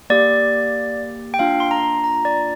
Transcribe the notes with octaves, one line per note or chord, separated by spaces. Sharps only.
A#3 G4 D5
G5
A#3 D4 F4 F5
C6
A#5
A#5
D5